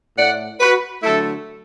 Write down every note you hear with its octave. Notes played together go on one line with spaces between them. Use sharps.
A2 A3 D5 F#5
F#4 B4
D3 F#3 A3 E4 A4